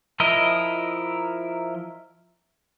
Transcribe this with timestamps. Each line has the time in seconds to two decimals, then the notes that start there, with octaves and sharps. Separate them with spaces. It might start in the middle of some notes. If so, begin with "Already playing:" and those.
0.20 F3 E4 A#4 D#5